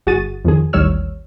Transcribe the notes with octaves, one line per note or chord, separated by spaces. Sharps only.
G1 F#4 G#4 A6 D#7
F2 D#3 G#4
A1 D#2 G3 C#5 E6 F6